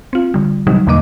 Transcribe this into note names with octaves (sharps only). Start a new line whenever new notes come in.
C4 F4
D3 G3
C3 D#3 F#3 G3 D#4
E2 B2 D3 A#3 D#5 D6